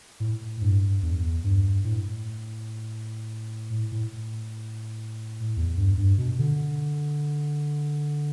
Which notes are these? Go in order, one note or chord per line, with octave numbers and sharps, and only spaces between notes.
A2
G2
E2
G2
A2
A2
E2
G2
G2
B2
D3